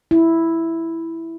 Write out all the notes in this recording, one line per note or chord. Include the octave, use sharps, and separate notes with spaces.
E4